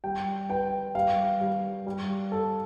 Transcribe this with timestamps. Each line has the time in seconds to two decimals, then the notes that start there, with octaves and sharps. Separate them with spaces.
0.04 G3 G5
0.50 B4 G5
0.95 G3 F5
1.41 G3
1.87 G3
2.32 A4